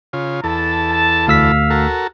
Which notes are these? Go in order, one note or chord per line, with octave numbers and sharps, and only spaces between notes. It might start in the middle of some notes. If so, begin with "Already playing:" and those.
C#3 F4
E2 A4 A5
A5
D2 F5 E6 B6
F#4 A4 A#4